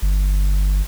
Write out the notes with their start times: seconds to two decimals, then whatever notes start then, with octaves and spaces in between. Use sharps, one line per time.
0.02 G1